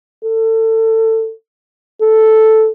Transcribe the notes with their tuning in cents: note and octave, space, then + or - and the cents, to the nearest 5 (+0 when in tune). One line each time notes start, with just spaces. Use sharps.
A4 +25
A4 -5